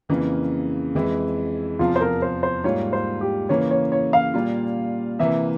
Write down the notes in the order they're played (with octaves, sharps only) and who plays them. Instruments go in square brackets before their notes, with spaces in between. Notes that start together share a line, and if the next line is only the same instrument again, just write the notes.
[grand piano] F2 C#3 E3 A#3
F2 E3 G#3 E4
[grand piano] E2 C3 F3 [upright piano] F4
[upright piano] C5
A#4
C5
C5
[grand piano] G#2 G3 A#3 F4 [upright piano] C#5
[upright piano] C5
G4
[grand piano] C#3 E3 A#3 [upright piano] C#5
[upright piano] C#5
C#5
F5
[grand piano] A#2 G3 A#3 F4
[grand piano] C3 E3 A#3 [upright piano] E5